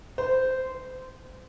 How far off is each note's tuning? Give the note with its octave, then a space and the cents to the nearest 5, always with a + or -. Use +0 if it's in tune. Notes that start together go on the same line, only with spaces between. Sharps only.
C5 -15
C5 -30